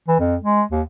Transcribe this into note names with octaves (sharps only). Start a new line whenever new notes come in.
E3
F2
G#3
D#2